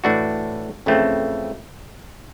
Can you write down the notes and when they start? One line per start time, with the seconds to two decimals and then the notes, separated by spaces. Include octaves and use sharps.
0.04 A2 E3 A3 D4 F#4
0.86 F2 C#3 E3 A3 C4